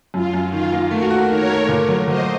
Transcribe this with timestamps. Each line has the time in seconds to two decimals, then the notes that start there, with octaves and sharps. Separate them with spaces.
0.14 F#2 F4
0.33 F#2
0.52 D#3 F4
0.72 A#3
0.91 A3 F#4 A#4
1.10 F#4
1.30 D#3 A#4 C#5
1.50 A3
1.68 A#2
1.89 F#3
2.07 F#3 C5 D#5